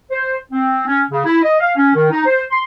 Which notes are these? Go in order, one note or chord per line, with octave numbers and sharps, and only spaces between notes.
C5
C4
C#4
C#3
E4
D#5
F5
C#4
D#3
D#4
C5
C6